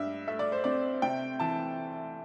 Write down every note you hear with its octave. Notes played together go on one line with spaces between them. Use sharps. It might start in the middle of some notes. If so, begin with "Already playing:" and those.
Already playing: G2 E5
A3 E5
D5
C5
C4 D5
C3 G5
E3 A5